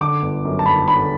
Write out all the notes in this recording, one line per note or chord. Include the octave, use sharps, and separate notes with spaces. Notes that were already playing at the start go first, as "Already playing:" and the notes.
D3 D6
G1
F#2
A5
G1 B5
D3 B5